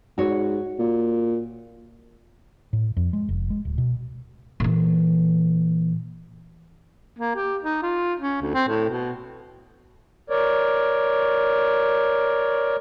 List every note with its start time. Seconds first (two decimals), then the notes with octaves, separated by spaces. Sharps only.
0.18 G#2 F#4 C#5
0.79 A#2
2.73 A2
2.97 F2
3.13 G#3
3.29 F1
3.50 G#3
3.65 D1
3.78 B2
4.60 A#2 E3
7.19 A#3
7.36 G4
7.63 D#4
7.82 F4
8.20 C#4
8.42 D2
8.54 C4
8.69 A2
8.90 B2
10.30 A#4 C#5 D5